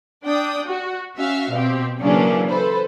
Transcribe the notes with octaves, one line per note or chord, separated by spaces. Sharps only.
D4 D5 G5 D#6
F#4
C#4 F#4 E5 F5
B2 C4 G4
C#3 E3 F#3 A#3 C#4 D4
A4 B4 C5